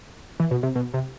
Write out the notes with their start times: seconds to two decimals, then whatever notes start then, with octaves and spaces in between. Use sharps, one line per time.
0.40 E3
0.51 B2
0.63 C3
0.76 B2
0.94 C3